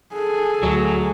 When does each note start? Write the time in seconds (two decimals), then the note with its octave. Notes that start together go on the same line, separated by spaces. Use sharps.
0.14 G#4 A4
0.63 D2 F#3 A3